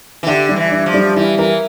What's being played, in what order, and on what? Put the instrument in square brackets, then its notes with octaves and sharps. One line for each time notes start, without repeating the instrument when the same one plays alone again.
[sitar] E3
[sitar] D3 [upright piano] G4
[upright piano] G3
[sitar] E3
[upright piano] D4
[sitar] F3
[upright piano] G3
[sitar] E3 [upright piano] E4
[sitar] E3 [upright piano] A#4